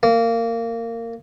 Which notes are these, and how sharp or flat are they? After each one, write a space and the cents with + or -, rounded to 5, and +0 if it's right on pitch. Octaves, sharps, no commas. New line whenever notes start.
A#3 -20